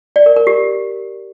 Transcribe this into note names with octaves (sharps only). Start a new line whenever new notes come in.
D5
A#4
A#4
G4